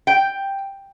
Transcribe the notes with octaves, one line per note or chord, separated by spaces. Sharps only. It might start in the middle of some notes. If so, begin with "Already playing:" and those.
G5